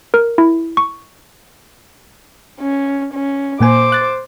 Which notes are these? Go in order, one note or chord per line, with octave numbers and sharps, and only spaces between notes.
A#4
E4
C#6
C#4
C#4
A#2 A#3 C5 G#5 D6
F#6 A6